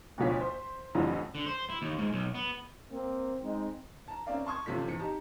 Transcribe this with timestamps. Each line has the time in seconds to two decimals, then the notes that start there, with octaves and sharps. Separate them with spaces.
0.18 D2 B2 D3 F3 C#5 B6
0.41 C5
0.95 F2 A2 D3 E3 F#3 G3
1.35 D3
1.46 C5
1.70 E4
1.82 D#2
1.98 G#2
2.13 B1
2.35 B3
2.91 A#3 C4
3.43 G#3 C4 D#4
4.08 A5 A#5
4.26 A#3 C4 C#4 D5 F5 A#5
4.46 A5 C6 C#6 D#6 G#6
4.66 A1 C3 F3 F4 A4 B6
4.88 G#1 E2 C#7
4.99 D#4 G4 A5 A#5